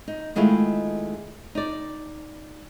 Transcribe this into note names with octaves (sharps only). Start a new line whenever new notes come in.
D#4
D#3 G#3 A3 B3 E4 F4
D#4 D5